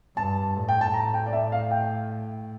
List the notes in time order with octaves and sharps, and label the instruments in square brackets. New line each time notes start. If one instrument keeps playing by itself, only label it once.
[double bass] G2 [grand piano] A5
[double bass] A2
[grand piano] G5
A5
A#5
G5
D5
E5
F5
G5